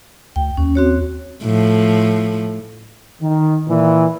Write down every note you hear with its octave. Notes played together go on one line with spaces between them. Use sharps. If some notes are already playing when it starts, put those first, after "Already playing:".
D2 G5
D#2 C#4
C4 F#4 C#5
A2 F3
D#3
A#2 E3